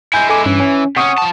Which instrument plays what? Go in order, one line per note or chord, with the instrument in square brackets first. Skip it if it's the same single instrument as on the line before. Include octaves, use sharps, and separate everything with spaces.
[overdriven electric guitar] G#3 E4 [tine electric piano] G#5 G6
[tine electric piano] A4 G#5 D6
[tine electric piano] G2 C#4 [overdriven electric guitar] E3
[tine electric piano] C#4
[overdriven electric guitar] C3 C#4 [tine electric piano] F#5 C#6 D#6
[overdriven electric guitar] F3 A5